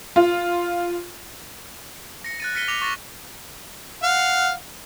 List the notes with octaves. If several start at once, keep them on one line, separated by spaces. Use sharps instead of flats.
F4
A#6 C#7
F#6 A6 D#7
F6 A#6 B6 C#7 D#7 G7
D6 A#6 C#7 F7 G7
C#6 A6 A#6
F5 F#5